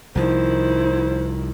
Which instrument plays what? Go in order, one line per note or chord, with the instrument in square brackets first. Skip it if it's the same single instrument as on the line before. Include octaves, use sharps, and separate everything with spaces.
[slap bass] C2 F3 [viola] D#3 E4 [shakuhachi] C5